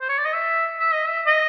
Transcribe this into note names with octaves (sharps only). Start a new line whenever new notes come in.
C5
C#5
D5
D#5
E5
E5
D#5
E5
D#5